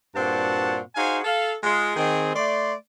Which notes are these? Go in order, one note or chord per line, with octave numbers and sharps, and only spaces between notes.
G2 A#2 C4 F#4 F#5 A5
D#4 F#4 G#4 C5 F5 G#5
A4 F5
G#3 F4
D#3 C4 G#4
A3 D5 C6